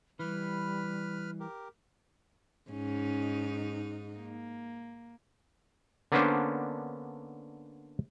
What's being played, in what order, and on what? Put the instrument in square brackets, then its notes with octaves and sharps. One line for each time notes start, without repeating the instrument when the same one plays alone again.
[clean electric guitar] E3 [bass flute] G3 [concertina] B4 B5 F6
[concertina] G4 A#4
[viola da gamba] G#2 D#4 [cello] C#4
[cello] A#3
[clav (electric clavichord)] D3 A#3 B3 C#4 D4 C5